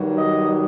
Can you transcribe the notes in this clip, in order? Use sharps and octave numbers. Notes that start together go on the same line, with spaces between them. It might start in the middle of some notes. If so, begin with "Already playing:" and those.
Already playing: G2 D#3 F#3
D#5